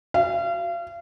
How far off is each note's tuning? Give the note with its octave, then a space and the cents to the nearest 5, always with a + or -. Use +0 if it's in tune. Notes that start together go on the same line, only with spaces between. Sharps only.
F5 -35